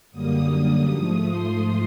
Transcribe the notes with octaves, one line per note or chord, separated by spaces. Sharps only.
F#2 D3 G3 A#3 D#6
G#2 F3 A3 D#6
C6